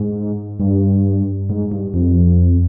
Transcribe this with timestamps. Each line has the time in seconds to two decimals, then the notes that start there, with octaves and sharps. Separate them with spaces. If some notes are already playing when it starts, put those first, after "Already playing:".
Already playing: G#2
0.60 G2
1.50 G#2
1.72 G2
1.94 F2